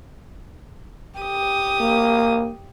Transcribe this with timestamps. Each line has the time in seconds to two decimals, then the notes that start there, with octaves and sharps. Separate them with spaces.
1.20 G4 D#6
1.80 A#3